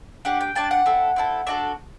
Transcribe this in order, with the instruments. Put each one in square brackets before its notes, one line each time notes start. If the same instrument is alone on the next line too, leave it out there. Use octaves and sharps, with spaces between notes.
[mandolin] D4 G4 F#5
G5
D4 G4 A5
F#5
C4 E4 A4
C4 E4 A4
D4 F#4 A4 E5